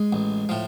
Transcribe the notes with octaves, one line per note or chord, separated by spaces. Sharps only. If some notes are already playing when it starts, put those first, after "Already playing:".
Already playing: G#3 G#4
A1
A2 F3